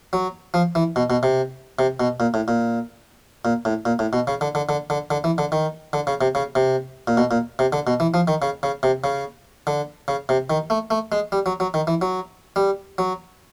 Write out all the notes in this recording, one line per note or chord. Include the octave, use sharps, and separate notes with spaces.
F#3
F3
E3
B2
B2
C3
C3
B2
A#2
A2
A#2
A#2
A2
A#2
A2
B2
C#3
D3
D3
D3
D3
D3
E3
D3
D#3
D3
C#3
C3
C#3
C3
A#2
B2
A#2
C3
D3
B2
E3
F3
D#3
C#3
C#3
C3
C#3
D3
C#3
C3
D#3
A3
A3
G#3
G3
F#3
F#3
D#3
E3
F#3
G3
F#3